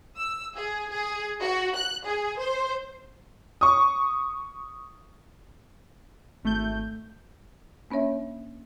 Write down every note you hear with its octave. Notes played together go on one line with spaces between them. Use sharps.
E6
G#4
G#4
F#4
F#6
G#4
C5
C#6 D#6
G#1 A3 G6
A#3 C#4 D4 C#5 E5